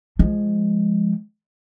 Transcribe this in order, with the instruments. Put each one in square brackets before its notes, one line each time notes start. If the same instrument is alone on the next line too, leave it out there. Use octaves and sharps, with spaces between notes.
[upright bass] F3 G#3